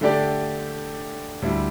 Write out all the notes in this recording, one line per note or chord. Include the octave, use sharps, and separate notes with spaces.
D3 A3 D4 G4 D5
D2 D3 G3 E4 G4